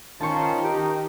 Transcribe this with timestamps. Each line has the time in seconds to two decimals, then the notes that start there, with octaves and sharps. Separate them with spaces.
0.21 D#3 C#4 F4 C5 A5 C#6
0.64 D#4 G4